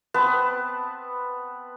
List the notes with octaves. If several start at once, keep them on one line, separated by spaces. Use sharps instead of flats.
B3 C4 B4 A5